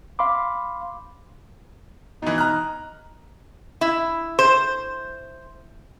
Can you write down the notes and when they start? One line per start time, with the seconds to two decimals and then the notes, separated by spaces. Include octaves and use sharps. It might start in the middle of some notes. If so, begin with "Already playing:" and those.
0.19 F5 B5 C6 D6
2.22 B2 E3 D#4
2.38 A#5 F6 F#6
3.81 E4
4.39 C5